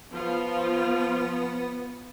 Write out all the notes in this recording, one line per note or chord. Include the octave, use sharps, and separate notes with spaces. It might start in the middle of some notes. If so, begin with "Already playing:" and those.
F3 B3 F4